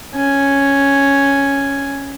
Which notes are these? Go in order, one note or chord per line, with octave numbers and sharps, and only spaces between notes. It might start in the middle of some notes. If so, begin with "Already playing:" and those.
C#4 G#5